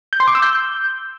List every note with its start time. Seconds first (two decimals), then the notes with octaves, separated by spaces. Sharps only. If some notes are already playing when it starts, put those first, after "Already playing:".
0.13 G6
0.20 C6
0.27 D6
0.35 E6
0.42 G6